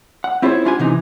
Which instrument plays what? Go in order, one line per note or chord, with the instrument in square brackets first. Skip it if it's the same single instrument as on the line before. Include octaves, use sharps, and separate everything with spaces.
[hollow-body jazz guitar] F#5
C4 E4 F4 G#4 C5 C#5
C#4 D4 F4 G4 F#5 G#5
C3 E3 D#4